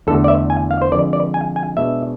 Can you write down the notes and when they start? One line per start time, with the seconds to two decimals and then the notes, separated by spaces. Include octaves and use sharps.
0.07 E2 D3 A3 A4
0.24 D5
0.28 E5
0.50 G#5
0.71 F5
0.82 C5
0.92 F2 D3 G#3 D5
1.13 D5
1.34 G#5
1.56 G#5
1.77 B2 G#3 B3 D4 E5